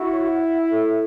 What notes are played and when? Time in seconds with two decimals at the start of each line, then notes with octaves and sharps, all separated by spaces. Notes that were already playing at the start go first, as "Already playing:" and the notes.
Already playing: E4 F#4 F#5
0.13 C#5
0.40 E5
0.69 A4